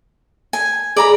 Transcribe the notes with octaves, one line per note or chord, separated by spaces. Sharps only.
G#5
G#4 D5 A#5 B5